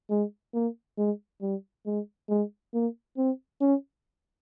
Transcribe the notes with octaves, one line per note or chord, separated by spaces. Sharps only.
G#3
A#3
G#3
G3
G#3
G#3
A#3
C4
C#4